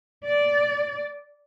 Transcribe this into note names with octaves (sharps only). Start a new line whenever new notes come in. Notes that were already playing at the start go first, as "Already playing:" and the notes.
D5